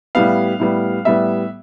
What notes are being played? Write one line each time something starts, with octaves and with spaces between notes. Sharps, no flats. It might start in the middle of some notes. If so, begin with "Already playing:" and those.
A2 G3 B3 F5
A2 G3 B3
A2 G3 B3 E5